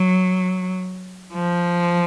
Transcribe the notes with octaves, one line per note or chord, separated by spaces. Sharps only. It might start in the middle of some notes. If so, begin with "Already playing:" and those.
Already playing: F#3
F3